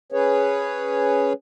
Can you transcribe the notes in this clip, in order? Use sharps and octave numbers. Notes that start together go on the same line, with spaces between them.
C#4 G#4 B4 C#5